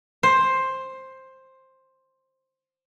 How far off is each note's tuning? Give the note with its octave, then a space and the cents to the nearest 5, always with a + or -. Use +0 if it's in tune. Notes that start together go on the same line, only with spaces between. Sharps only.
C5 +10